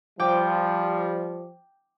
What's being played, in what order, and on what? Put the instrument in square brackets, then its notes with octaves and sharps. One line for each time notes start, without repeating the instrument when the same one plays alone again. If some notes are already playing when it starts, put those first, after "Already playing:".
[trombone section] F3 G3 [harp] G5 D6